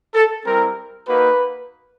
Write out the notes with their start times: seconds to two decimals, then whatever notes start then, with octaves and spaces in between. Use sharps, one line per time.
0.15 A4
0.46 G3 C4 E4 A#4
1.09 A#3 D#4 F#4 B4